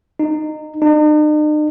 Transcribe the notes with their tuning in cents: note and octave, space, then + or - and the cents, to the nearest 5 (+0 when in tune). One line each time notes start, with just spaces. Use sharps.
D#4 -20
D#4 -45